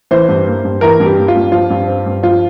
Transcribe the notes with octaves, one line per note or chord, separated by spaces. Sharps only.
E3 C5
G2
A#3
G2
E3 A#4
G2
G4
A#3
F4
G2
F3 F4
G2
C4
G2
F3 F4